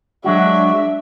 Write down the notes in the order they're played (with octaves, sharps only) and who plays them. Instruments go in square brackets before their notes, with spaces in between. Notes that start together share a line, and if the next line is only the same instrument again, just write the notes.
[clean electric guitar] F#3 G#3 F#4 [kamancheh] D4 E5